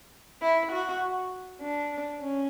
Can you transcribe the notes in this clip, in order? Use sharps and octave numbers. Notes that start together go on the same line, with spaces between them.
E4
F#4
D4
C#4